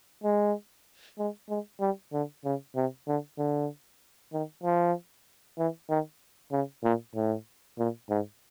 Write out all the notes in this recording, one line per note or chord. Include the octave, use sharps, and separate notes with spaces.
G#3
G#3
G#3
G3
D3
C#3
C3
D3
D3
D#3
F3
E3
D#3
C#3
A#2
A2
A#2
G#2